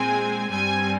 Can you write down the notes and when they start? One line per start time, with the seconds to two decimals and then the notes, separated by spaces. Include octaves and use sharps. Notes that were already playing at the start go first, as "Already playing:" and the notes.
Already playing: A#2 G#3 C4 G#5
0.50 G2 G3 C4 G#5